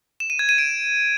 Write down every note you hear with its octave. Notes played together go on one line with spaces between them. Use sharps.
E7
D#7
G#6
D#7
D7